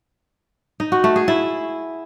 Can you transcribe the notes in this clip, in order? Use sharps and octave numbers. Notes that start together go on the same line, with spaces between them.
D#4
F#4
A3
G#4
E4